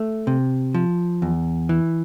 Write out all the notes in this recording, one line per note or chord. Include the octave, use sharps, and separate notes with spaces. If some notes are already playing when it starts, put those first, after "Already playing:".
Already playing: A3
C3
F3
E2
E3